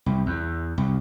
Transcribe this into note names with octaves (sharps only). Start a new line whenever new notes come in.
C2
E2
C2